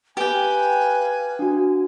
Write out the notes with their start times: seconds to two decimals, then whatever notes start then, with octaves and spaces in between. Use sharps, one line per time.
0.17 G4 B4 F5 G5 G#5
1.39 D4 F#4